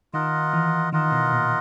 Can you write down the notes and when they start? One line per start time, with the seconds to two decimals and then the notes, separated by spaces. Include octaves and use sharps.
0.13 D#3 F4 A#4 D#5 F#5
0.53 E3
0.93 D#3 F4 A#4 D#5 F#5
1.12 B2
1.31 A#2